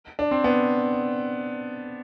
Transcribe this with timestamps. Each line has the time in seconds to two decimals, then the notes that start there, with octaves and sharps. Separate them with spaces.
0.19 D4
0.31 C4
0.44 B3